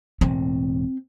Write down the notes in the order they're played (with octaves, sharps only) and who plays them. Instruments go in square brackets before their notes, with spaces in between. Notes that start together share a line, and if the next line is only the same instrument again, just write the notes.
[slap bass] E1 A2 [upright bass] C4